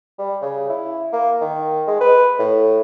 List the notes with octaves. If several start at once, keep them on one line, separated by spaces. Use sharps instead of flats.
G3
C#3
E4
A#3
D#3
G#3
B4
A2